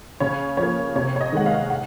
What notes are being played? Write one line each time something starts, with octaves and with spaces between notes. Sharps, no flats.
C#3 C#5
F3 C#5
A#3
C3 C#5
C#5
D#5
D#3 G#3 F#5
F5
F#5